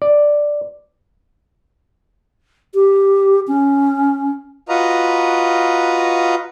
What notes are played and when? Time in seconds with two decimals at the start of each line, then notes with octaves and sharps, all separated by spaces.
0.02 D5
2.74 G4
3.48 C#4
4.69 F4 F#4 B4 D#5 A#5